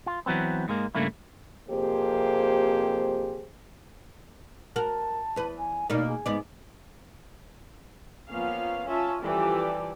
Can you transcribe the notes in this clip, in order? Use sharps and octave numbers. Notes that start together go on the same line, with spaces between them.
F4
E3 F#3 B3 C4
G#2 G#3 A#3
G2 C#3 A3 A#3 E4
F2 C3 A#3 G4 G#4 C5
F#4 A#4 A5
E2 B4
G#5
B2 A#3 D#4 D5
G#4
G#2 B3 D5
F3 A#3 B3 C#4 F5
C#4 F4 E5 A5
E3 F3 G3 G4 A4 D5